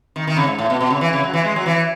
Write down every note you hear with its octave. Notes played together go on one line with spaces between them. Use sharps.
D#3
D#3
C#3
G#2
A2
B2
B2
C#3
E3
C#3
F#3
E3
G#3
F#3
E3